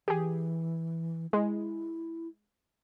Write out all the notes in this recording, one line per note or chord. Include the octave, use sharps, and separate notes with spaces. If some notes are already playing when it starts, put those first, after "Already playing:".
E3 G4 G#4
G#3 E4